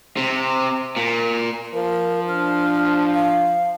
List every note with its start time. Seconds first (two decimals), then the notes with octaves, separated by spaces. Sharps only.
0.17 C3
0.96 A#2
1.74 F3 A#4
2.29 D4 F6
3.14 F5